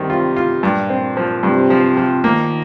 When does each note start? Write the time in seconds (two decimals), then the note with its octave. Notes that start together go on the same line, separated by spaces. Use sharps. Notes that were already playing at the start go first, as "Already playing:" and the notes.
Already playing: C3 D#3 G3
0.10 F4
0.36 F4
0.63 G2 A#2
0.90 C4
1.17 F3
1.43 G2 C3
1.70 F3
1.97 F3
2.24 D#3 A#3